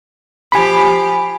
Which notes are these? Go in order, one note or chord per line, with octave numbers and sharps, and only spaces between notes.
F3 G4 G#5 B5